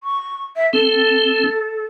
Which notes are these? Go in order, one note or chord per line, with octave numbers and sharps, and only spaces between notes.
C#6
E5
C4 A4